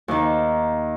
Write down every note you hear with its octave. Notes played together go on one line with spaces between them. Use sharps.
D#2 D#3